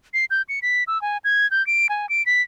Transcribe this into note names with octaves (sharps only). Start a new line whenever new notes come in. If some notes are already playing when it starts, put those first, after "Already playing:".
C7
G6
C#7
B6
E6
G#5
G#6
G6
D7
G#5
D7
B6